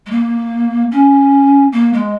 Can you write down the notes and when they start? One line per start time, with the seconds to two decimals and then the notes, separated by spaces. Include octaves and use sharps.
0.06 G#3
0.11 A#3
0.91 C#4
1.72 A#3
1.93 G#3